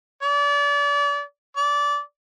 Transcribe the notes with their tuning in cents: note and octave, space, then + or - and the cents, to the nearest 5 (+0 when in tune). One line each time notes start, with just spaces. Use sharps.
D5 -35
D5 -20